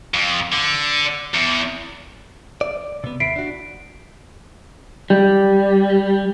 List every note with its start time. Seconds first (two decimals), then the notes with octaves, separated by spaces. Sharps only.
0.14 F2
0.52 D3
1.34 E2
2.61 D5
3.04 C3 B3
3.20 D#2 E4 B6 C7 D7
3.36 D4 F#4
5.10 G3